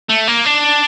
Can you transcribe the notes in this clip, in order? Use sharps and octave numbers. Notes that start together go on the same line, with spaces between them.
A3
A#3
D4